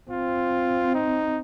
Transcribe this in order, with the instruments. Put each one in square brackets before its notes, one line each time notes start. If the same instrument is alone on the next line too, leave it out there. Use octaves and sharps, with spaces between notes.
[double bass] C4 [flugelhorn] F4
[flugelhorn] D#4